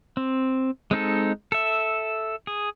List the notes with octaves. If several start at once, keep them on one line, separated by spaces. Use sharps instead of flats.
C4
G#3 C4 D#4 A4
A4 E5
G#4